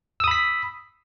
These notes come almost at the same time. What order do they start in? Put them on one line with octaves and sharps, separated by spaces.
E6 D#6 B5 B6